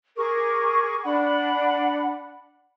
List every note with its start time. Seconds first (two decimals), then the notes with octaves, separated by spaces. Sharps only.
0.16 G#4 A#4 C#6 D6
1.04 D4 F#5 B5